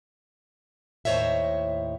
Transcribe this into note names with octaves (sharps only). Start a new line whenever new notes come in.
D#2 A2 C5 C#5 D#5 E5